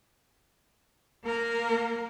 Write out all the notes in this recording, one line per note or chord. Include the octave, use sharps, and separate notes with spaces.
A#3 A#4